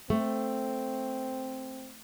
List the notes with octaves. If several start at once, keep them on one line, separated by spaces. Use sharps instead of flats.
A3 C4